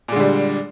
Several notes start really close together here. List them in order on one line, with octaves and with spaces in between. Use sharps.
A#2 G#3 D3 G3